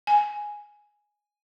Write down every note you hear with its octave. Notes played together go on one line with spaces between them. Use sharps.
G#5